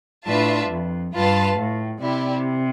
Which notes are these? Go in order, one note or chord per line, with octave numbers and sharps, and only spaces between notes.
A2 D4 F4 B4 E5 A5
F2
G2 F4 B4 F5 A5
A2
C3 E4 G4 D5